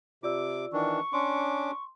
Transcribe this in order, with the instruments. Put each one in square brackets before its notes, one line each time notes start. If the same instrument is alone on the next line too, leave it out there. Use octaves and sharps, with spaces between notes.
[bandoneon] C3 D6 [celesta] F4 D5 E6
[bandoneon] D#3 E3 D4 [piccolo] C#6
[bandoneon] C#4 D4 D6 [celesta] C6